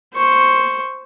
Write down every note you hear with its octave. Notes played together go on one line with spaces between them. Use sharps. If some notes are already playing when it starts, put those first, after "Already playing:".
C5 C#6